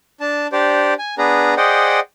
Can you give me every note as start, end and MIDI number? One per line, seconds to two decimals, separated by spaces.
0.20 0.47 62
0.20 0.47 81
0.52 0.94 62
0.52 0.94 67
0.52 0.94 72
0.52 0.94 74
0.99 1.15 80
1.18 1.54 59
1.18 1.54 62
1.18 1.54 68
1.18 1.54 71
1.18 1.54 82
1.57 2.00 68
1.57 2.00 72
1.57 2.00 74
1.57 2.00 75
1.57 2.00 78
1.57 2.00 79